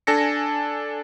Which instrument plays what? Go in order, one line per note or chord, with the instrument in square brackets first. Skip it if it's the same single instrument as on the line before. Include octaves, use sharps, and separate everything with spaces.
[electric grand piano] D4 A4 G#5 A#6 C#7